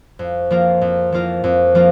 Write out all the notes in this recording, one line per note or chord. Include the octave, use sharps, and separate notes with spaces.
F2
F3 A#3 F4 A#4
F2
F3 A#3 F4 A#4
F2
F3 A#3 F4 A#4